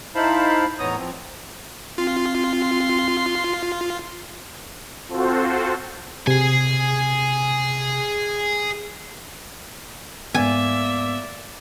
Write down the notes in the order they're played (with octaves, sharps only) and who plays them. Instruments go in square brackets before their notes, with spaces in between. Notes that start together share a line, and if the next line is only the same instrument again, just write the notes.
[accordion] D#4 E4 C5 F5 A5 B5
E2 A2 B3 C#5 A#5 D#6
F3 C4
[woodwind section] C4 [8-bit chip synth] F4 [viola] C6
[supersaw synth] C4 F4 F#4 A4 C5
[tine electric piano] C3 [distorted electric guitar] G#4 G#5
[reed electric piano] G#2 B3 [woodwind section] A#3 D5 [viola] E5 [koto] G#5